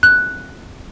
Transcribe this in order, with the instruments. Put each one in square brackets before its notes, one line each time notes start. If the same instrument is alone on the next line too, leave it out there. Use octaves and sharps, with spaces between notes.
[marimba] F#6